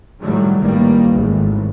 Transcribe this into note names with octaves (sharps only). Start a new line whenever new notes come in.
A2 D#3 F#3 G3
A1 D#3 G3 A#3
G#1 A2